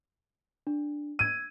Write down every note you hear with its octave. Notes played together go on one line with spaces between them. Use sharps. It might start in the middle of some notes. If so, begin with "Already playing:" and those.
D4
E6 G#6 D#7